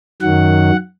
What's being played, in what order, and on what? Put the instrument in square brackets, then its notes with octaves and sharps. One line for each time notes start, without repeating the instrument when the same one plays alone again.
[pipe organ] F#2 D#3 F#3 F#5